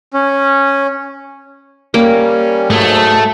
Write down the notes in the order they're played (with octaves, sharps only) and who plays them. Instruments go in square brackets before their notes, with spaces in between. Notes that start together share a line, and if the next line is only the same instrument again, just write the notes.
[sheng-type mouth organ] C#4
[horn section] G3 C#4 [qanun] A#3
[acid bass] G#2 [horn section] F#3 G#4 [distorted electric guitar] A3